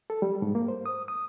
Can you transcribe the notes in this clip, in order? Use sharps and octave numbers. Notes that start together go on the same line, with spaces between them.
A4
G3
G#2
A#3
C5
D#6
D#6